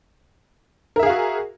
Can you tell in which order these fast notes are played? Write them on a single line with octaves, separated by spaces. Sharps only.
A#4 E5 G#4 F5 F#4